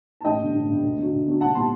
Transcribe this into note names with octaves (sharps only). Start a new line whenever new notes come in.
A5
A1 D#5 G5
G2 D3
A1
G2 D3
D2
D3 F#3
D2
D3 F#3
C2 F#5 A5
A#2 G3 A5 C6